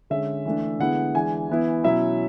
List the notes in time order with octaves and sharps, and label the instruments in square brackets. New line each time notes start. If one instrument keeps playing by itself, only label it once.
[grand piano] D3 G#3 C#4 E5
E3 A3 D4
D3 G#3 B3 E4 F#5
E3 G#3 D4 G#5
E3 B3 E4
B2 F#3 C#4 E4 E5